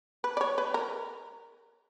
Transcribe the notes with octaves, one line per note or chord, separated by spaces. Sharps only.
B4
D5
C#5
B4
A#4